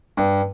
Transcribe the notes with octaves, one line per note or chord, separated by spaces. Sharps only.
G2